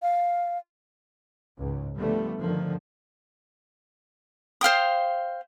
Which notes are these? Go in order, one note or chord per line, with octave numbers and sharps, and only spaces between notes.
F5
C#2 G#2
D3 F3 G3 A3 B3
G2 D3 D#3 F3
C5 F5 G5 D#6